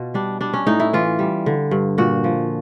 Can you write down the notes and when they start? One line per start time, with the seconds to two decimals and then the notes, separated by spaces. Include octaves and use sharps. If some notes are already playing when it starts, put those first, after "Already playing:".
Already playing: B2 F4
0.14 G3 D4
0.41 G3 D4
0.53 C#4
0.67 A2 D#4
0.80 E4
0.93 E3 F4
1.19 G3
1.46 D3
1.71 G2
1.98 A#2 F#4
2.24 F3